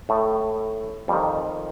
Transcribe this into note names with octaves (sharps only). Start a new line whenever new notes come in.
A2 A3
F2 D#3 G3